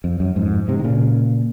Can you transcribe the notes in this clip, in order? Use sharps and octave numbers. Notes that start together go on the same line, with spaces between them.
F2
F#2
F2 G#2
G#2 C3
D#3
A#2 C#3